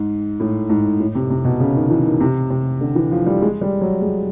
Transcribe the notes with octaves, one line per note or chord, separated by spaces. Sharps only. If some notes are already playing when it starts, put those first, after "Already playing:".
Already playing: G#2
A2
G#2
A2
C3
C3
B2
C#3
D#3
E3
D#3
C3
C3
D3
E3
F3
G3
G#3
G3
F#3
G#3